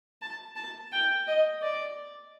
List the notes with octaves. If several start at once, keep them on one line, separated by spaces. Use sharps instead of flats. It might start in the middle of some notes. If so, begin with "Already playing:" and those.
A5
A5
G5
D#5
D5